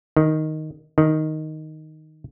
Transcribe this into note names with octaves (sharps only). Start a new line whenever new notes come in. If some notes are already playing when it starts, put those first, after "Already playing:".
D#3
D#3